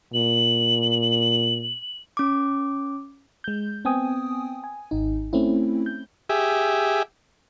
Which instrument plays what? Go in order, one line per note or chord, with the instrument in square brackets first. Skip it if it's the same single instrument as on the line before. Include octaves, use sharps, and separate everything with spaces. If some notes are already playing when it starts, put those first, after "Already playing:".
[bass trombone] A#2 [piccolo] F#7
[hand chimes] C#4 D6
[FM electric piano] G#3 G6
B3 C4 G5 G#5 D#6
G#5
G#1 D#4
A3 C4 C#4 E4
G6
[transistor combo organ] G4 G#4 E5